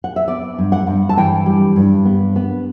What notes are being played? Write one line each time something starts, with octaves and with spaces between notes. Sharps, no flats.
F#5
E5
B3 D5
G2
F#5
G2
A5
E3 G5
G3
G2
B3
B3